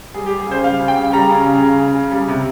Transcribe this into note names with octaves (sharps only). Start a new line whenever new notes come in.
G3 G#4
G4
G3
G#4
C#3 C5
G3 F5
C#3
G5
C#3
G3 A#5
C#3
C#3
C#3
C#3
C#3
G3
C3